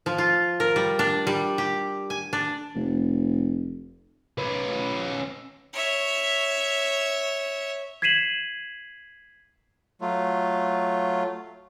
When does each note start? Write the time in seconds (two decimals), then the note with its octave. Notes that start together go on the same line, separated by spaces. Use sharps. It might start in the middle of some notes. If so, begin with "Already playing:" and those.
0.06 F3
0.18 F4
0.60 A#4
0.76 G3
0.99 D4
1.27 G3
1.58 G4
2.10 G#5
2.33 D4
2.75 F1
4.38 C#4 B4
5.73 C#5 E5
8.02 G#6 B6 C7 D#7 E7 F#7
10.01 F#3 A3 F4